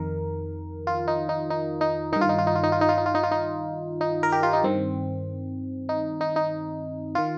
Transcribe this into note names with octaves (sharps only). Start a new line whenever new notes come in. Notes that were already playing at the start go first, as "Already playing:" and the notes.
Already playing: F2 D#3 A#4
F4
D#4
D#4
D#4
D#4
G2 D#3 D#4
F4
D#4
F4
D#4
F4
D#4
F4
D#4
F4
D#4
F4
D#4
F4
D#4
D#4
A#4
G4
F4
D#4
G2 D#3 C4
D#4
D#4
D#4
D#3 F4